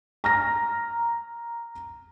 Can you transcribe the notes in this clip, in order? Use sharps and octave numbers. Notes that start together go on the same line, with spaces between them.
A#5 F6 A#6